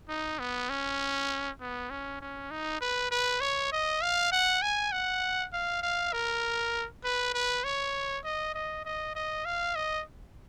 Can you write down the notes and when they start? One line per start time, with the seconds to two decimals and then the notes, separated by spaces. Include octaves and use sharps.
0.09 D#4
0.39 B3
0.69 C#4
1.60 B3
1.90 C#4
2.21 C#4
2.51 D#4
2.81 B4
3.11 B4
3.41 C#5
3.72 D#5
4.02 F5
4.32 F#5
4.62 G#5
4.92 F#5
5.53 F5
5.83 F5
6.13 A#4
7.04 B4
7.34 B4
7.64 C#5
8.24 D#5
8.54 D#5
8.85 D#5
9.15 D#5
9.45 F5
9.76 D#5